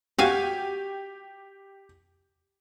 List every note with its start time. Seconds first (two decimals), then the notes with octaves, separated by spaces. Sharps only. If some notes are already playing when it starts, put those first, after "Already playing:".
0.18 F#4 G4 F5 G#5